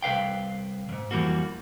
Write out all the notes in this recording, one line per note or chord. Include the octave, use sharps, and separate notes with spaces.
C2 B4 F5 G5
D#2 G#2
F2 E3 G3 A#3 F#4